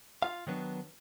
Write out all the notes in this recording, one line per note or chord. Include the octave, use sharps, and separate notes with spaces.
F4 F5
D#3 F#3 B3 D4